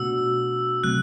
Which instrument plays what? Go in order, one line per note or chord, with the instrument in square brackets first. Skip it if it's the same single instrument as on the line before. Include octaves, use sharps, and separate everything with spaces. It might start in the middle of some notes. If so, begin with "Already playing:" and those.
Already playing: [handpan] B2 A3 D4 F#4 [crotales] E6
[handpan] C3 F#3 A3 C4 [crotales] F#6